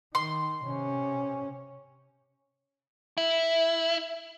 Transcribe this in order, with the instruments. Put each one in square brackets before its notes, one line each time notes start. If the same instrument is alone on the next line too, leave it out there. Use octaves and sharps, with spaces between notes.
[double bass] D#3 [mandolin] C6
[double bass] C3 C#4
[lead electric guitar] E4